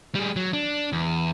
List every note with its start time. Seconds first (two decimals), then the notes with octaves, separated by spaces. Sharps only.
0.15 G3 G#4
0.36 F#3
0.53 D4
0.93 E2